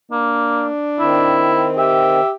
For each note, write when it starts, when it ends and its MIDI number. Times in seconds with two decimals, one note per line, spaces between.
0.12 0.69 58
0.12 1.59 62
0.99 2.20 51
0.99 2.20 60
0.99 1.68 64
1.78 2.33 67
1.78 2.31 76